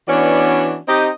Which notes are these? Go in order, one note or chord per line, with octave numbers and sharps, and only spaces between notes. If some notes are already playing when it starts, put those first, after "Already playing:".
E3 B3 C#4 D4 F#4 D5
C4 D#4 G4 D#5